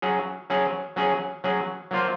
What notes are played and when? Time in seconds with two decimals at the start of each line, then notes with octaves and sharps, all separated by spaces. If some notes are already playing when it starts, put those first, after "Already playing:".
0.02 F#3 C#4 G#4
0.50 F#3 C#4 G#4
0.96 F#3 C#4 G#4
1.44 F#3 C#4 G#4
1.91 F#3 A#3 F4 C5